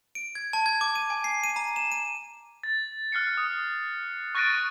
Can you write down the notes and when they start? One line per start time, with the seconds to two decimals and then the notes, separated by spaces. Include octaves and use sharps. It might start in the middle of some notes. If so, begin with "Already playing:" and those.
0.15 D7
0.35 G#6
0.53 A5
0.66 G#6
0.81 D6
0.95 D#7
1.10 G#5
1.24 C7
1.44 D#7
1.56 A#5
1.76 E7
1.92 D#7
2.63 A6
3.12 F6 F#6 C7 C#7
3.37 D#6
4.35 C#6 F#6 A6 A#6 D7 D#7